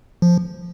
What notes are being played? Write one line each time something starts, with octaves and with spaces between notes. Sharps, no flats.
F3